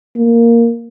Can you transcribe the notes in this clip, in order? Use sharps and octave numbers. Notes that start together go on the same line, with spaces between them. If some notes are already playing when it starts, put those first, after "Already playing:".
A#3